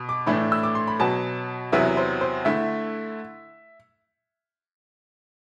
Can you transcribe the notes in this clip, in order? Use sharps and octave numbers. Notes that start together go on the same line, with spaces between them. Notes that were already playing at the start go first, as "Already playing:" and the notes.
Already playing: B2
D6
A2 E3 A3 D4 B5
E6
D6
C6
B5
B2 F#3 B3 A5
E2 C3 F#3 B3 E4 E5
C5
C5
D3 A3 E4 E5